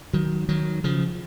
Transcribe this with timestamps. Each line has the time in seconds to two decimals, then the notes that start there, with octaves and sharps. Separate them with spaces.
0.13 D#3 F#3
0.49 D#3 F#3
0.84 C#3 F3